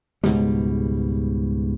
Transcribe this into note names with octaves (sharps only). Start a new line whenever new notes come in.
C#2 G#2 B2 G3